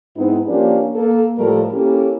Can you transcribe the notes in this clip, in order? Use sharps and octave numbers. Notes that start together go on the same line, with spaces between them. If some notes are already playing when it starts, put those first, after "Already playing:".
G#2 B3 C4 D#4 E4
F3 A#3 C#4 D4 F4 G4
A#3 A4
A2 F3 G3 A3 A4 A#4
A#3 C#4 E4 G4 A4 A#4